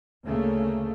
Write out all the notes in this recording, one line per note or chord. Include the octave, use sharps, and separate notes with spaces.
D2 C#3 A3 A#3